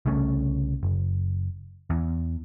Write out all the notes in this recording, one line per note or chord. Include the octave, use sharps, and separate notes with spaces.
C2 C#3 A3 C#4
F#1
E2